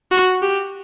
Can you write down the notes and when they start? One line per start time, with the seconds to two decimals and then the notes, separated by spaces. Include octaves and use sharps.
0.11 F#4
0.42 G4